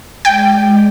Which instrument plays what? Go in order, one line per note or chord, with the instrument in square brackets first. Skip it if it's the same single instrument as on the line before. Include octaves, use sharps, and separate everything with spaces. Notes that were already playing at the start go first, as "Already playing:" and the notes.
[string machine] G#3 D5 [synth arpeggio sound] G5